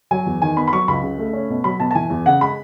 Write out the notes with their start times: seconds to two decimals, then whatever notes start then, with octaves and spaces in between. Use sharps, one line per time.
0.11 F#3 G#5
0.26 E2
0.41 D#3 G#5
0.57 B3 B5
0.68 B5
0.72 F#3 C#6
0.88 C#2 B5
1.03 C#3
1.18 A3
1.33 C#4
1.50 B2
1.64 F#3 B5
1.80 B2 A5
1.91 A5
1.95 E3 G#5
2.10 E2
2.26 C#3 F#5
2.41 G#3 B5